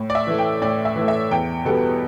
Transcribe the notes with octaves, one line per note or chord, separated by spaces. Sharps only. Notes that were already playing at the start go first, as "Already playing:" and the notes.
Already playing: A2
D5
E5
E3 A3
G5
A2 D5
E5
E3
A3
E5
E2 G5
B2 G3 B3 A4